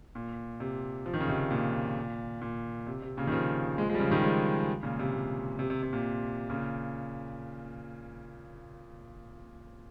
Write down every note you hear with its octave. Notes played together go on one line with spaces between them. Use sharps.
A#2
C3
F3
D#3
C#3
C3 D#3
A#2
A#2
C3
C3
A#2 C#3
D#3
C#3 F3
F3 G#3
F3 G#3
G3
C#3 F3
D#3 G3
F3 G#3
A#2 C#3
C3
A#2
C3
C3
C3
A#2
A#2 C#3